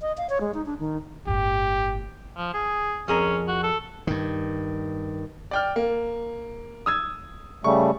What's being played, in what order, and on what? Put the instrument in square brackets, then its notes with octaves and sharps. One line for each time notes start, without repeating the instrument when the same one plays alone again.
[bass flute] D#5
F5
C#5
G#3
D#4
D4
D#3
[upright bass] G1 A2 [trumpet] G4
[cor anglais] F3
G#4
[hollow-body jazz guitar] F2 G#4 A#4 [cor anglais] C#4
[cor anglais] F#4
A4
[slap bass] G2 D#3
[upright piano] D5 G5 F6
A#3
D#6 E6 G#6
[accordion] C#3 G3 A3 [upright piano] C#6